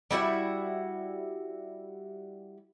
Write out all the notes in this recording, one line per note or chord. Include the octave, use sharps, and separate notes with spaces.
G3 E4 F#4 E5